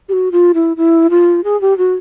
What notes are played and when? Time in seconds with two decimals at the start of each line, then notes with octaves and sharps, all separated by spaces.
0.09 G4
0.13 F#4
0.32 F4
0.54 E4
0.77 E4
1.10 F4
1.44 G#4
1.61 G4
1.78 F#4